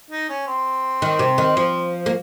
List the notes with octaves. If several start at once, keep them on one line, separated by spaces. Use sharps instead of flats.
D#4
C#4
C4
D#3
C3
D#3
F3
A#3